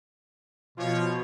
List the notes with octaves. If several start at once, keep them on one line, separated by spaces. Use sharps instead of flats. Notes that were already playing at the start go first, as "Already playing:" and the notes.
B2 F3 F4 C#5